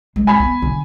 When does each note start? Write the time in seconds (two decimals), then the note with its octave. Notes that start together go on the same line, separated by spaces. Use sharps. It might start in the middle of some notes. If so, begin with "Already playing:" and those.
0.16 G#3
0.27 G#5 B5
0.40 B3
0.62 D3